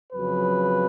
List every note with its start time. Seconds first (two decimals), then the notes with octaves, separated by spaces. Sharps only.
0.13 F2 C#3 F#3 B4